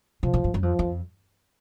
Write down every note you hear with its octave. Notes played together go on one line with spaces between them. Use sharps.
C3 F3
A#2
G#2
F#2
F2 F3
F2